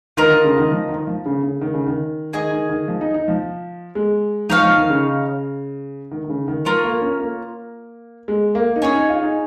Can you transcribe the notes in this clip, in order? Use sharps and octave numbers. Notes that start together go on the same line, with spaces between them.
D#3 F4 A#4 D#5
D#3
C#3
D#3
F3
D#3
F3
C#3
C#3
D#3
C#3
D#3
D#3 G#4 D#5 G#5
D#3
D#3
F3
D#4
D#4
F3
G#3
F3 D#4 C#5 F5
F3
D#3
C#3
D#3
D#3
C#3
D#3
F3 F4 A#4 C#5
A#3
C#4
A#3
G#3
A#3
D#4
C#4 G#4 C#5 G#5
D#4
F4
D#4